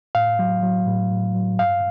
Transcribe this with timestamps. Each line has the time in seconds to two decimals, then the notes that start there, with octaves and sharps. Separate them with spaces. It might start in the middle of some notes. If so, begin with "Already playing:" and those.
0.15 A2 F5
0.39 F#3
0.63 F#3
0.87 A2
1.11 A2
1.34 F#3
1.59 G2 F5